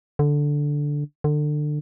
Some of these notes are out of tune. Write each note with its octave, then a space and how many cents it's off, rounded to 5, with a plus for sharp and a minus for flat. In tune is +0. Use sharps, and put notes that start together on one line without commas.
D3 -5
D3 +25